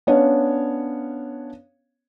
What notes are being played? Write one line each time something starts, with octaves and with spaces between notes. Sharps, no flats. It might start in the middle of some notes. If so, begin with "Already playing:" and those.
B3 C#4 D4 C#5 F5